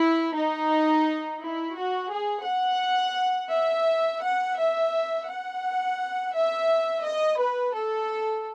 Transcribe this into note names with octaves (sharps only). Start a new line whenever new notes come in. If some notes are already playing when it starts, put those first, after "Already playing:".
Already playing: E4
D#4
E4
F#4
G#4
F#5
E5
F#5
E5
F#5
E5
D#5
B4
A4